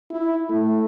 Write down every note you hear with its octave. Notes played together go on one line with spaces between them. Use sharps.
E4
A3